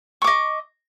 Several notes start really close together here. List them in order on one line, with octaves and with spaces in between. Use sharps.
C#6 D6 D#5